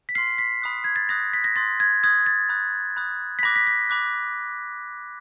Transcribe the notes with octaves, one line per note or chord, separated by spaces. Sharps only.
B6
C6 F6 C7
B6
B5 D#6 F#6
G#6
A6
B5 D#6 F#6 A#6
B6
A#6
C6 D#6 F#6 A6
G#6
C6 D#6 F#6 G#6
A6
B5 D#6 F#6
B5 D#6 F#6
B6
B5 D6 F#6 A#6
B6
B6
B5 D6 F#6